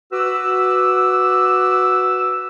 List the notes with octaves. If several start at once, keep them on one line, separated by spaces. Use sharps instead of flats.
F#4 B4 D6 E6